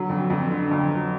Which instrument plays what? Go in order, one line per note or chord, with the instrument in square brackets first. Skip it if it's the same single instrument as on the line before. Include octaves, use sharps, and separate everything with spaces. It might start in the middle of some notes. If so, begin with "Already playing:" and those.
Already playing: [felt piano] D3 F#3
F2
F2
D3
F2
F#3